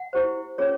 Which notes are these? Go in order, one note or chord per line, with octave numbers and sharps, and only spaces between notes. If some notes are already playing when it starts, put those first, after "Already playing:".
Already playing: F#5
E4 G4 C5
C#4 F4 G#4 C#5